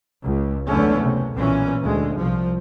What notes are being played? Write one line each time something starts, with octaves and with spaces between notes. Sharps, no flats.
C#2
F#1 E2 D3 A3 B3 C#4
C3
B1 A#2 E3 C#4
D2 G#3
C2 F3